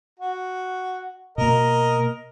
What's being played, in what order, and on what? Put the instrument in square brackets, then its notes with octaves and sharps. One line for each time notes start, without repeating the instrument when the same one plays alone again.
[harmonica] F#4
[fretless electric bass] B2 A#3 [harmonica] A#4 D#5